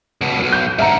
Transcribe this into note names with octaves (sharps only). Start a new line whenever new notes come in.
C#2 B2
B1 F#2
G6
G#2 D3 E5 A#5